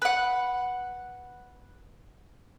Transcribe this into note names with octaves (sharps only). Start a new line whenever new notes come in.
B4 F#5